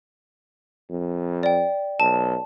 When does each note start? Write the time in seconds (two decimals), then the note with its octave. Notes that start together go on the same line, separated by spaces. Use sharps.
0.90 F2
1.43 D5 G5
2.00 B1 A5